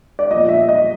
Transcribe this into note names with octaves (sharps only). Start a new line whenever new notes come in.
D5
A#2 F3 D#5
E5
D#5